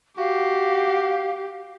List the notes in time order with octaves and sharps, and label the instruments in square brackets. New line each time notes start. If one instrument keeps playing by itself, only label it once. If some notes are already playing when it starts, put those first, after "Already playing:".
[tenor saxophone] F#4 [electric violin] G4 [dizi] F5